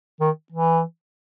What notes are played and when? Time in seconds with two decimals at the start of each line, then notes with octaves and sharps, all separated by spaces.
0.20 D#3
0.52 E3